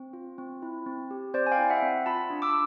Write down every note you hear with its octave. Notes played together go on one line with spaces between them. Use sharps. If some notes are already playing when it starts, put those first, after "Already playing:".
Already playing: C4
F4
C4
E4
C4
G4
C4 C5 D5
G#5
F5 G5
E4
E5 F#5
C4
F4 A5 B5
D4
D6 E6